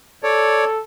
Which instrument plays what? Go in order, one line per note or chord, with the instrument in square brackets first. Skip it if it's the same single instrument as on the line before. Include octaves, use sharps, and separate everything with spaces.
[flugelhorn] A4 [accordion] C#5 D5